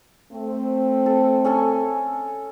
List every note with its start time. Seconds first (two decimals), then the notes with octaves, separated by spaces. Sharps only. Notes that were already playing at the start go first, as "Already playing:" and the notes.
0.32 A3 C4
1.06 A4
1.44 C#4 A4 G#5